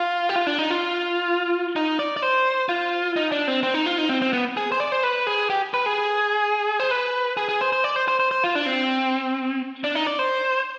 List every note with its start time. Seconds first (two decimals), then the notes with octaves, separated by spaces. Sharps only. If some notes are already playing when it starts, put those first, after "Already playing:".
Already playing: F4
0.29 G4
0.36 F4
0.47 D4
0.58 D#4
0.71 F4
1.76 D#4
1.99 D5
2.17 D5
2.22 C5
2.69 F4
3.16 D#4
3.32 D4
3.48 C4
3.63 C4
3.74 D#4
3.86 F4
3.98 D#4
4.09 C4
4.22 C4
4.33 B3
4.57 G#4
4.72 C5
4.80 D5
4.92 C5
5.03 B4
5.27 G#4
5.50 G4
5.74 B4
5.86 G#4
6.80 C5
6.91 B4
7.37 G#4
7.49 G#4
7.61 C5
7.72 C5
7.84 D5
7.96 C5
8.08 C5
8.20 C5
8.31 C5
8.44 F4
8.55 D4
8.66 C4
9.84 D4
9.95 D#4
10.07 D5
10.19 C5